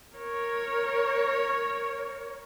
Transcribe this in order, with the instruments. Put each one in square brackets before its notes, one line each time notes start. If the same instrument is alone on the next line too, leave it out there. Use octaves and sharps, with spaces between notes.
[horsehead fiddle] A#4 C#5